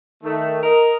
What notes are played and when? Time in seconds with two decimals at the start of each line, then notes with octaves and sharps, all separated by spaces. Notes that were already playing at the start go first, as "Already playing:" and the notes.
0.24 D#3 A3
0.62 A#4 D#5